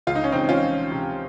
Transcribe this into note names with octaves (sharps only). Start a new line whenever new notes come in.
C#2 F4
D#4
C#4
C#2 C4 D#4
C#4 F4
F3
C3